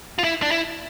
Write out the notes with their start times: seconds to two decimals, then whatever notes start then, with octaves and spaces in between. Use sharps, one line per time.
0.18 F4
0.24 E4
0.42 D4
0.51 E4